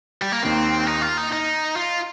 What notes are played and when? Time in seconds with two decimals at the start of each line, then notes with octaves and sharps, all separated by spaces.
0.22 G3
0.32 A#3
0.43 D#2 D#3 A#3 C4
0.87 D#4
1.02 F4
1.17 D#4
1.32 D#4
1.76 F4